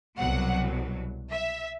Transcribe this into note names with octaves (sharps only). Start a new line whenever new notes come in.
C2 B2 F#3 F#5
E5